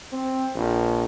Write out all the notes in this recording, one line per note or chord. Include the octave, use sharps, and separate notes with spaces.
C4
A#1